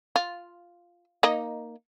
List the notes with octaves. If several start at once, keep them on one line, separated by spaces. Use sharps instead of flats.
F4
A#3 D#4 D#5